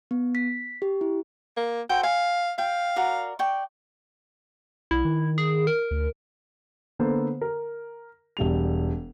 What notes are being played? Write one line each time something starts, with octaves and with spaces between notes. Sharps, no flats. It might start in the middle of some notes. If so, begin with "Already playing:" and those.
B3
B6
G4
E4
A#3
F#4 A4 C5 G5
F5 G#5
F5 G5
F#4 A#4 D5
D5 G5 C#6
B1 E4
D#3
G#4
A#4
D2
D3 A#3 B3 A4 C5
A#4
E1 G3 F7